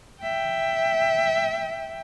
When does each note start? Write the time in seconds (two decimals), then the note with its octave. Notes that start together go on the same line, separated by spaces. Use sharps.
0.22 E5 G5